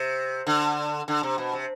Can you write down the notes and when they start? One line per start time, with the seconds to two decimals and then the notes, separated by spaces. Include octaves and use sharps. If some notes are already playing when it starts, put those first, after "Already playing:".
Already playing: C3
0.47 D3
1.08 D3
1.23 C3
1.38 B2
1.53 C3